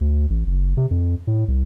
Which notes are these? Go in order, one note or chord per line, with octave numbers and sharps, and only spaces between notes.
D2
A1
F#1
C3
F2
A2
C2